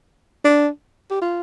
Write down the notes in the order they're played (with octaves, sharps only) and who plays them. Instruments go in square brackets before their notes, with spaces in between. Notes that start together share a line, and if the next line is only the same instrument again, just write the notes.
[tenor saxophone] D4
G4
F4